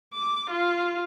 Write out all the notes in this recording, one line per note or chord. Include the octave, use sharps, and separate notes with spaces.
D6
F4